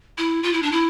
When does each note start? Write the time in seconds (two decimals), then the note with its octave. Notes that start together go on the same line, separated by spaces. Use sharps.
0.18 E4
0.43 F4
0.53 E4
0.62 D4
0.72 E4